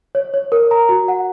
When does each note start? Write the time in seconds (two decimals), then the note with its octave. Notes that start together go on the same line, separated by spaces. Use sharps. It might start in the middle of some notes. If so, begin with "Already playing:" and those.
0.15 C#5
0.34 C#5
0.52 A#4
0.71 A#5
0.89 F#4
1.08 F#5